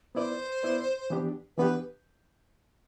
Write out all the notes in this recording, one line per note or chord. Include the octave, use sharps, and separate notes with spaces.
B3 E4 B4 C5 D5
B3 E4 B4 D5
E3 B3 D4 G4
E3 B3 D4 G4 B4